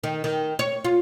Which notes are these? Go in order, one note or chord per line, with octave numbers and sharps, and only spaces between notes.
D#3
D#3
C#5
F4